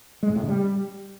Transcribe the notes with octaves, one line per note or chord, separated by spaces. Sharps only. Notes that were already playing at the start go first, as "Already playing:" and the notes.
G#3
G#2
A2
C#3
G3